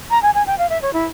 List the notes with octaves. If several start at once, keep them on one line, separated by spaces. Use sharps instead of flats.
A#5
G#5
G#5
G5
F5
E5
C#5
E4